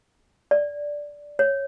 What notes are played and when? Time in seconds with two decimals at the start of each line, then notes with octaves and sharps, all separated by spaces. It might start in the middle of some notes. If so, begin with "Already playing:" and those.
0.51 D5
1.39 C#5